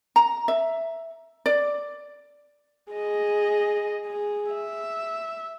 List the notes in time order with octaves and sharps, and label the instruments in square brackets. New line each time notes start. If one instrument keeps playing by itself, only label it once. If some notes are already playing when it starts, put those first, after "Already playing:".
[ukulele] A#5
E5
D5
[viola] G#4 D#5
G#4
E5